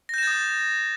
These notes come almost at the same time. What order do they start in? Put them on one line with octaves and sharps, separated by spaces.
A#6 G6 E7 A6 D#6